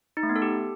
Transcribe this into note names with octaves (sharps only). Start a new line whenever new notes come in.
D#4
A3
B3
A4
G4